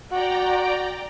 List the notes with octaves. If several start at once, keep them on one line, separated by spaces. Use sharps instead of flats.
F#4 D5 G5 A#5